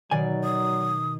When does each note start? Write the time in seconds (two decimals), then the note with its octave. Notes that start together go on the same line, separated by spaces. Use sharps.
0.11 B2 D#3 F#3 D5 G#5
0.44 D#6